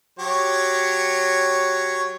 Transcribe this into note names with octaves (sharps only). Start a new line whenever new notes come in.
F#3 G4 C#5